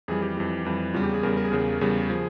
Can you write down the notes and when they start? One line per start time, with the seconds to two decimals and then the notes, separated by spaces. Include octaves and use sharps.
0.08 F2 E3 G3 G#4
0.22 G4
0.37 F2 E3 G3
0.65 F2 E3 G3
0.94 E2 C#3 G3 F4
1.03 G4
1.14 G#4
1.23 E2 C#3 G3 A#4
1.37 A#4
1.45 G#4
1.51 E2 C#3 G3 A#4
1.81 E2 C#3 G3
2.09 F3 G#4